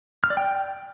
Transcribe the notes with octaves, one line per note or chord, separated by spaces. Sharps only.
F6
D5
G5